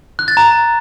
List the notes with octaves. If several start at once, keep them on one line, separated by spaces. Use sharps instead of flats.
F#6
A6
A#5